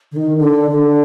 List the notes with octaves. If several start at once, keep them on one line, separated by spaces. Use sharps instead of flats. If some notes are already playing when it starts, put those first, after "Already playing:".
D3
D#3
D3
D3